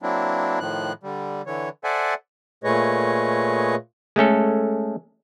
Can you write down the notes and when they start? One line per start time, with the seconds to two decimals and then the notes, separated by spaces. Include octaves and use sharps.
0.03 F#3 A#3 C4 D4 E4
0.60 A2 D#3 F3 F#6
1.03 D3 G3
1.46 D3 E3 C#5
1.84 A4 C5 D5 E5 F#5 G#5
2.64 A#2 A3 G#4 B4 C#5 D#5
4.16 G#3 A3 C#4 A4